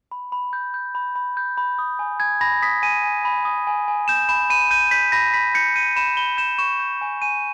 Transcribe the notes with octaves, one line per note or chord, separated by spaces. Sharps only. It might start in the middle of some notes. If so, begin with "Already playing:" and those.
B5
B5
G6
G6
B5
B5
G6
B5
D#6
G#5
G#5 G#6
B5 A#6
D#6 B6
G#5 D#7
G#5
B5
D#6
G#5
G#5
G6 E7
B5 E7
B5 D#7
G6 D#7
G6 B6
B5 A#6
B5 B6
G6 C#7
G6 D#7
B5 E7
B5 G7
G6 E7
C#6 E7
G6
G#5
G#5 D#7